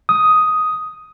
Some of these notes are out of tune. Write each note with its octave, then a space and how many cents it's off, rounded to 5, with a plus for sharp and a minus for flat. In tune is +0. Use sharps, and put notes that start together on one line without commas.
D#6 +5